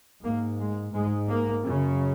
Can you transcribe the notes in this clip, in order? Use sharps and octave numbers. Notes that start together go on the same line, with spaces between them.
G#2 A#3
G#3
G#2 G#3
A#3
F#2 C#3